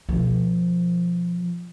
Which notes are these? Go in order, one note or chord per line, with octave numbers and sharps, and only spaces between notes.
B2 F3